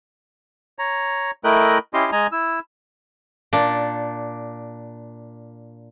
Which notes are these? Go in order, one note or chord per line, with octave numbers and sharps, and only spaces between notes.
C#5 A#5
A3 E4 A#4 D#5 G5 F#6
C#4 E4 G4 D#5 C6
G#3 D#5 G#5 A#5
E4 E6
A#2 D4